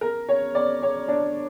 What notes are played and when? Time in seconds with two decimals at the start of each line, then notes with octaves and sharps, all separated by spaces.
0.01 A#4
0.29 C#5
0.55 D5
0.83 C#5
1.08 D4